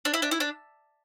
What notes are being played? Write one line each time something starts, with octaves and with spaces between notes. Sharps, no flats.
D4
E4
D4
E4
D4